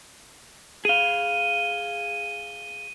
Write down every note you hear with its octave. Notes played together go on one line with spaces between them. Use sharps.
G#4 F5 D#7 G7